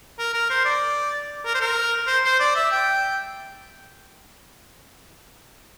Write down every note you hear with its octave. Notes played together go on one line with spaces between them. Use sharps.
A#4
A#4
C5
D5
A#4
C5
A#4
C5
C5
D5
E5
G5